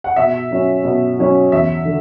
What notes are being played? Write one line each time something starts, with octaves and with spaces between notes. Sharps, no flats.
F#5
B2 E5
F#3 C#4
B2
F#3 C#4
E2 E5
D3